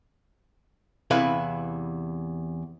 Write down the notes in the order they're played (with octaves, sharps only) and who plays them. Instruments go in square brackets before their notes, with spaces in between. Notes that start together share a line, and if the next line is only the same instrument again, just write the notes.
[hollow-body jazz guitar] E2 C3 E4 B4 F5